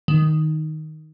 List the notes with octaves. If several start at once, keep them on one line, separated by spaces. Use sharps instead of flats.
D#3